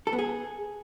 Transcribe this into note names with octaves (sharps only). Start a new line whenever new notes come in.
A4
B3
G#4